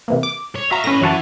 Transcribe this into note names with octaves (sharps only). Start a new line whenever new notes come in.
C3 E3 A#3
D6
C#5
F#4 E5 F5 A#5
A2 C#4 B4 A#6
F#2 E3 E4 F#4 A5